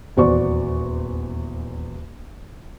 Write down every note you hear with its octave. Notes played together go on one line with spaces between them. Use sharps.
D#1 E2 F#4 C5 D5 C#6